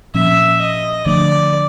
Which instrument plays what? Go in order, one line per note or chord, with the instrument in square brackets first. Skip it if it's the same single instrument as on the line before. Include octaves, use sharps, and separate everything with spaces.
[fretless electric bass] A#2 F3 A#3 C#4 [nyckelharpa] E5
[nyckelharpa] D#5
[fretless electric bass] D3 F3 A3 D4 [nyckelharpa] D5